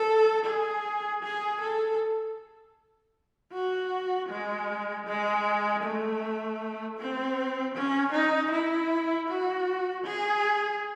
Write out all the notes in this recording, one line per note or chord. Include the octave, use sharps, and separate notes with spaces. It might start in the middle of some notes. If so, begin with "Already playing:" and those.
Already playing: A4
G#4
G#4
A4
F#4
G#3
G#3
A3
C4
C#4
D#4
E4
F#4
G#4